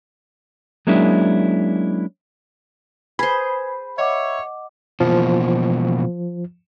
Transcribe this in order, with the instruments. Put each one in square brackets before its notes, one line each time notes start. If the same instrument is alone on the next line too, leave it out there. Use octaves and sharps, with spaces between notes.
[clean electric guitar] F#3 G#3 A#3 C#4 D4 E4
[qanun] G#4 C5 [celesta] B4 G#5 G#6 [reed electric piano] B5
[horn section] C#5 E5 [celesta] D#5 F#5 D6
[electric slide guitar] B2 E3 A#3 [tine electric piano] F3